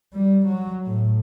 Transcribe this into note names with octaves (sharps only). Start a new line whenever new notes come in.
G3
F#3
A2